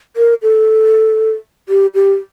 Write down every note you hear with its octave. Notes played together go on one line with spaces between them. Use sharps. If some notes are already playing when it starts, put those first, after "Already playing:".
A#4
A4
G4
G4